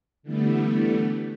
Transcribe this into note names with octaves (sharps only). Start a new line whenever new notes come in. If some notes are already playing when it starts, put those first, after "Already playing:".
D3 E3 G3 A3 B3